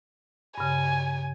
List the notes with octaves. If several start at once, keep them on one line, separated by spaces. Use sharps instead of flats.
G2 C#3 G#5